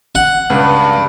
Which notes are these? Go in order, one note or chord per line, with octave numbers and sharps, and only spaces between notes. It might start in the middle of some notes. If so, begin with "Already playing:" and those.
F#5
C#2 G2